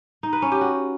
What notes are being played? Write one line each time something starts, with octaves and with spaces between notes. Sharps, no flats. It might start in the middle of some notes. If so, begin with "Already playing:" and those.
D#4
B4
C#4
G4
F#4